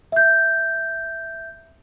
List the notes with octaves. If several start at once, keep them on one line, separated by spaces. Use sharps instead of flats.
E5 G6